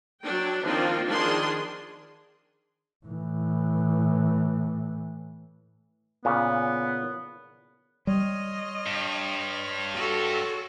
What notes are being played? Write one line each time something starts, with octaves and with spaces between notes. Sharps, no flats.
F#3 D4 G5
D#3 F3 A#3 C4 D4 F4
D#3 F3 D4 G#4 C6
A2 E3
A#2 C#3 B3
G3 C#5 D#5 C6 F6
G2
F#4 A4